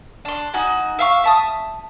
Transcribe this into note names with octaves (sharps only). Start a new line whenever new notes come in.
D4 C6
D#4 F#4 G#5
E5 F5 C#6
E5 A5 D#6